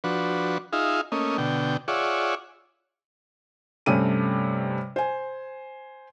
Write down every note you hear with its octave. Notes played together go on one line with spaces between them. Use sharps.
F3 D4 F#4 B4
D#4 F4 G#4 E5 F5
A3 A#3 C#4 D#5
B2 D3 G5
F4 G#4 C#5 D5 E5 F#5
G2 C3 A3 C#4 D#7
C5 G#5